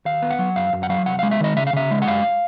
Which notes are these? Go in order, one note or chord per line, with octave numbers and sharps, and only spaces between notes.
D#2 F5
B3
F#5
F#3
F#2 F5
F#2
F#5
F#3 F5
C2 F#5
G#3 F5
E5
D#3 D#5
C#3 E5
F5
C#3 E5
G#3
F#5
F#2 F5